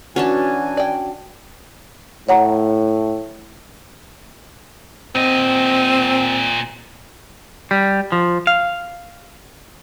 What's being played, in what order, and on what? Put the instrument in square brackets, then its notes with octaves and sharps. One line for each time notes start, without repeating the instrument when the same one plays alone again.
[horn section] E3 G#5 [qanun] C#4 D4 A5 [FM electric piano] F#4
[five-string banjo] D5 G5
[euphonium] A2 [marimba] C#5 F#5 A#5
[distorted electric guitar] A#2 D#5 [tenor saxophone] C4
[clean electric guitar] G3
F3
F5